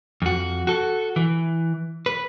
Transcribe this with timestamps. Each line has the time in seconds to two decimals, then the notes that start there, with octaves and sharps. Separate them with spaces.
0.22 F2 F#4
0.67 F#4 A4
1.16 E3
2.06 B4